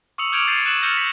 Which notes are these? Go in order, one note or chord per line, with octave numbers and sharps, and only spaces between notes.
C#6 D#6 E6 C#7 F7 F#7
D6 F6 G6 G#6 D7 F7
G6 A6 C7 C#7 D#7 E7
E6 F#6 C7 D#7 E7 F#7
E6 F6 G6 A6 A#6 C#7
B6 F#7